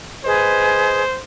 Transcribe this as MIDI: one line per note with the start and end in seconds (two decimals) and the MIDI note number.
0.25 1.01 68
0.25 1.01 71
0.25 1.22 72
0.25 1.01 75